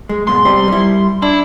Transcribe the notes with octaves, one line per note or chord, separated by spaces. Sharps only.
G#3
G#2 B2 G#3 C6
C3 G3 C5
G3 E4
D4 E4